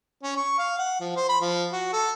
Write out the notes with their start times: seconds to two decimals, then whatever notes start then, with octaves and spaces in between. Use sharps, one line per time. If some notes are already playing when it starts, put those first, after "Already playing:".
0.23 C#4
0.37 C#6
0.59 F5
0.79 F#5
1.01 F3
1.16 C5
1.29 B5
1.41 F3
1.73 F#4
1.93 A4